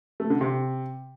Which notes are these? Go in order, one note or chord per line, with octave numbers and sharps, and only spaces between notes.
A3
D3
C3